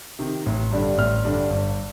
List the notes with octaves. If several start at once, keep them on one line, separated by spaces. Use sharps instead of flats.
C3 D#3
A1
G2 D3 G3 D4
A1 F6
G2 D3 G3 D4
G1